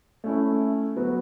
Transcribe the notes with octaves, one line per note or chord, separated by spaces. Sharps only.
A3 C#4 E4
F#3 B3 F#4